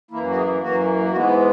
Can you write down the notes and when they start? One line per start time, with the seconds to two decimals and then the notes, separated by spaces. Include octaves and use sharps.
0.11 F#2 E3 A#3 E4
0.29 F#4
0.36 G#4
0.61 F#2 E3 A#3 F#4
1.12 G#2 E3 G#3 B3 F#4
1.27 E4